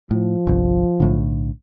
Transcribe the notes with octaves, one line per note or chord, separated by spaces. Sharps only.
A2 F3
G1 C2
B1 A2 D3